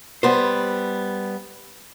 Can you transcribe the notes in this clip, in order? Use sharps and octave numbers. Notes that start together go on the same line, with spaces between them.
G3 B3 C5